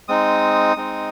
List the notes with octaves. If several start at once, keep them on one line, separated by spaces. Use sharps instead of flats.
G#3 C4 D#4 D#6
G#3 C4 D#4